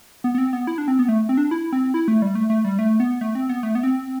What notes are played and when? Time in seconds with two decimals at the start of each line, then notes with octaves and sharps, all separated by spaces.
0.24 B3
0.35 B3
0.38 C4
0.53 B3
0.67 E4
0.78 D4
0.88 C4
0.99 B3
1.09 A3
1.29 C4
1.38 D4
1.51 E4
1.72 C4
1.94 E4
2.08 A3
2.22 G3
2.35 A3
2.50 A3
2.65 G3
2.79 A3
3.00 B3
3.21 A3
3.35 C4
3.49 B3
3.63 A3
3.75 B3
3.83 C4